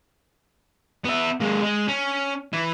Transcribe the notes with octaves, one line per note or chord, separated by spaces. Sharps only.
B3 E5
G#3 A#3
G#3
C#4
E3 E4